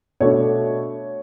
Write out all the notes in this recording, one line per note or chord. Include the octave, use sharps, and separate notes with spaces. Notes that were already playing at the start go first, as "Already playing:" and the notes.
B2 A3 D4 C#5